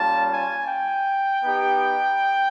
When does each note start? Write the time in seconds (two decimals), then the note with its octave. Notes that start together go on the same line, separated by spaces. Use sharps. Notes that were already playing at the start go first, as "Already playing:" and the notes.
Already playing: G3 A#3 C#4 F4 A5
0.30 G#5
0.68 G5
1.44 B3 D#4 G4